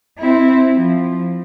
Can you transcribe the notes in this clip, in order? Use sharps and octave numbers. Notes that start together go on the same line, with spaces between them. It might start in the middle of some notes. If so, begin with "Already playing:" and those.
C4 E4
F3